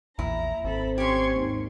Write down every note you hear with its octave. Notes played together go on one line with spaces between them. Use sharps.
A#1 E2 A#2 E4 A#5
G#1 C4 A4 B5
C#4 G4 C6 C#6 G#6
D#2 G#2